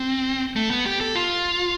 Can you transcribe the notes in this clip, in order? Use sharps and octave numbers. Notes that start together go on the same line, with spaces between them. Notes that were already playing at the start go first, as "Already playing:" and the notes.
Already playing: C4
A3
B3
G4
A4
F4